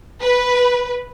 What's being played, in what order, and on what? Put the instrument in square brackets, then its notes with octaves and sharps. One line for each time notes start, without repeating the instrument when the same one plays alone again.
[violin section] B4